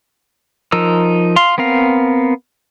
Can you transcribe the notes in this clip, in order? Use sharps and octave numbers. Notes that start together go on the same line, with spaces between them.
F3 D#4 A#4 E6
F5 C6
B3 C4 A#4 F5